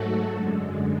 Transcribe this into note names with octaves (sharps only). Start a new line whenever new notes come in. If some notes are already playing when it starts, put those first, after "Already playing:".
Already playing: G#2 F#3 A3 F#4 A4
F#2 D3 G#3